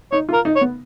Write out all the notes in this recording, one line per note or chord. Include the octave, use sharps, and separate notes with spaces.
D#4 C#5
F4
A#4
D#4
C#5
B3